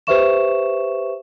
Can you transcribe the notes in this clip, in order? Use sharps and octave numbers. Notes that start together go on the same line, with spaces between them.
G4 B4 C5 E5 C#6 E7